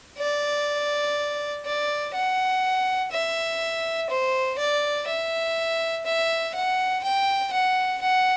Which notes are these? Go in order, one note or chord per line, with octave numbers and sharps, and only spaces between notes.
D5
D5
F#5
E5
C5
D5
E5
E5
F#5
G5
F#5
F#5